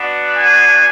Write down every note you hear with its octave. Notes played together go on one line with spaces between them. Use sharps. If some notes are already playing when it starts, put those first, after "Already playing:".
Already playing: B3 D4 F#4
G#5